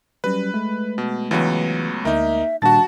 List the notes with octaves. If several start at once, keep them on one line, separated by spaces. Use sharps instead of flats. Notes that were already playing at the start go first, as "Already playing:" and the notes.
F#3 G3 C#4 B4
G#3 A3
B2
C#2 E3 F#3 B3
D2 A#3 D#4 E5
A#2 D#3 G3 D4 F#4 A5 A6